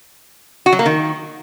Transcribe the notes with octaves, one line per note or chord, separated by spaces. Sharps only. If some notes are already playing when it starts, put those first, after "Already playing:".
F#4
F#3
A#3
D#3